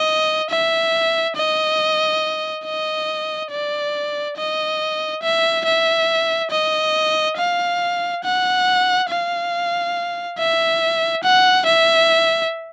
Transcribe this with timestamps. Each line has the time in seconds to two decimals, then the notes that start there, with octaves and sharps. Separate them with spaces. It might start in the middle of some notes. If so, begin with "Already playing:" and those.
Already playing: D#5
0.50 E5
1.36 D#5
2.65 D#5
3.51 D5
4.37 D#5
5.22 E5
5.65 E5
6.51 D#5
7.37 F5
8.24 F#5
9.09 F5
10.38 E5
11.23 F#5
11.67 E5